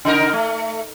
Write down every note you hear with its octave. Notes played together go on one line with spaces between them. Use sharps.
C#3 D#4 A#4
A3